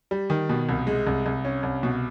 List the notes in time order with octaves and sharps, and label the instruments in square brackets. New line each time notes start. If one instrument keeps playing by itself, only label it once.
[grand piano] G3
D#3
B2
C2
G#3
C2
C2
C#4
C2
B2